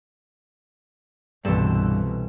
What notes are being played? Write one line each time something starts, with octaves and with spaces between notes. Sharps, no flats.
C2 G2 B2 E3 C4 A4